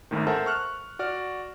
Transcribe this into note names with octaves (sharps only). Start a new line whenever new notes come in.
G#1 D2 A2 D#3
A4 A#4 C5 E5 F#5 A5
C#6 F6 F#6
F#4 D5 F6